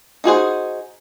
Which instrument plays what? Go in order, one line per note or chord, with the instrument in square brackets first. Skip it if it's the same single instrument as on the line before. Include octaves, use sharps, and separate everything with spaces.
[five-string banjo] D#4 F#4 G#4 C5